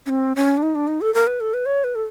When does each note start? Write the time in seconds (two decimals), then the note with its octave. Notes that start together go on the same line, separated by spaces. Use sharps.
0.06 C#4
0.09 C4
0.36 C#4
0.57 D4
0.63 D#4
0.75 D4
0.88 D#4
1.01 A4
1.14 A#4
1.27 B4
1.40 A4
1.54 B4
1.66 C#5
1.84 B4
1.95 A4